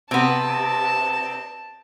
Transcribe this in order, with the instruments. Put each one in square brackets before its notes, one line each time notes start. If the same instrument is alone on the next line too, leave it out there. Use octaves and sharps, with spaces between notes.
[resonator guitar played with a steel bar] C3 B3 [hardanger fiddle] A5